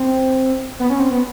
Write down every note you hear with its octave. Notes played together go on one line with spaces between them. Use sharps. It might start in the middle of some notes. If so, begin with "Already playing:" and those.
Already playing: C4
B3
C#4
C4
B3